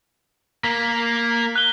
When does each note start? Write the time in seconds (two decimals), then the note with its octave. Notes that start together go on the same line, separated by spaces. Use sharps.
0.64 A#3 B6
1.56 F#6 G7